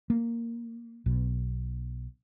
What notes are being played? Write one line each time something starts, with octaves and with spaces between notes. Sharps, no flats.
A#3
B1 B2